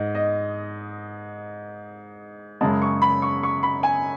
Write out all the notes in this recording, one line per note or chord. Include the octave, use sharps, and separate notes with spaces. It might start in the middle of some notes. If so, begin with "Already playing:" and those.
Already playing: G#2 D#5
D#5
F#2 C#3 G#3 A5
C#6
B5
C#6
C#6
B5
G#5